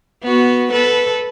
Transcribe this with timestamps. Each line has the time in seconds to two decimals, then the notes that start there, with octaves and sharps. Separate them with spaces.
0.23 B3 F#4
0.72 A4 B4